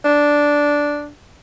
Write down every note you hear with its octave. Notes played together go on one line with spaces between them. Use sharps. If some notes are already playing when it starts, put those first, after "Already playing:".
D4